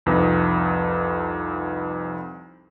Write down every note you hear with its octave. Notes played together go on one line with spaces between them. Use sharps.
C2 F2 D#4 B4